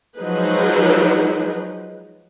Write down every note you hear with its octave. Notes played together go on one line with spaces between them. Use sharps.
F3 F#3 G#3 D#4 G#4 B4